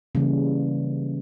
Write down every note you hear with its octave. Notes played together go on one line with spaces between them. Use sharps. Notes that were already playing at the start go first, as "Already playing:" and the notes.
C#3 E3 G3 A#3